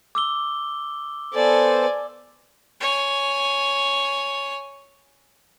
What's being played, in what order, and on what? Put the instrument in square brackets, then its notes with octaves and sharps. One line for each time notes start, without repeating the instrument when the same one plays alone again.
[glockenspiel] D6 E6 G7
[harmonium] B3 A4 C5 [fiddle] D5 G#5
[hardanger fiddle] C#5 G#5